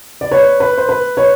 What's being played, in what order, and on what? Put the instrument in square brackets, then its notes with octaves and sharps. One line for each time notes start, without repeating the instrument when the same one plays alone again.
[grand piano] D5
B4 C#5
B4
C5
B4
B4 C#5